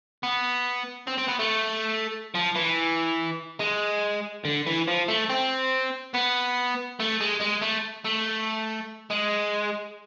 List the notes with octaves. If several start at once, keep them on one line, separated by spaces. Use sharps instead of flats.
B3
C4
C4
B3
A3
F3
E3
G#3
D3
E3
F3
A3
C4
B3
A3
G#3
G#3
A3
A3
G#3